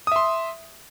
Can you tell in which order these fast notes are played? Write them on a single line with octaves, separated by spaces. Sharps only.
D#6 E5 C6